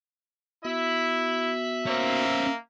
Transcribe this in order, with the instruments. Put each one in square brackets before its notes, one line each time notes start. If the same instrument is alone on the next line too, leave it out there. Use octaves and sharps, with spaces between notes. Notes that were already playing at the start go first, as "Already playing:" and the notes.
[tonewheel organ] B3 F#4 [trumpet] E4 [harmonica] E5
[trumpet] A#3 [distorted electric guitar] C#4 C5